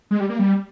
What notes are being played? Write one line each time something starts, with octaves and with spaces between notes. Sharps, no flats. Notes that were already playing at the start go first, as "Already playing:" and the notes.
G#3
G3
A#3
G3